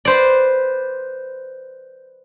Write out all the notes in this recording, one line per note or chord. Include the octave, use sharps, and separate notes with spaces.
B4 C5 D5